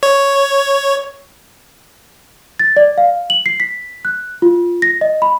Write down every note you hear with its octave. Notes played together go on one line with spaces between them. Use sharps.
C#5
A6
D5
F5
F#7
C7
B6
F#6
F4
A#6
D#5
B5